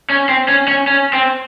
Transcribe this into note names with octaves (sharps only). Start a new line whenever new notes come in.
C#4
C4
C#4
C#4
C#4
C4